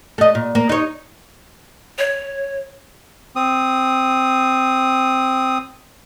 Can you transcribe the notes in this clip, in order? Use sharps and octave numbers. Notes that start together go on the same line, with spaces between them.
A3 D#5
A#2
A#3
D#4 C#5
C#5
C4 D#6